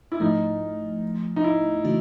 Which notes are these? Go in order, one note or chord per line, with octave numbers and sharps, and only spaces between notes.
E4
G#2 F3 A3 D#4
D#4
E4
C#3 E3 A3 D4 F#4